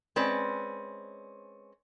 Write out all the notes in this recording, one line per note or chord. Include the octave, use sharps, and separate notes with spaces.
G#3 C4 C#4 B4 D5